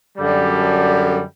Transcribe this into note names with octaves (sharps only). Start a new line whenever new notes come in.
F#2 D3 G3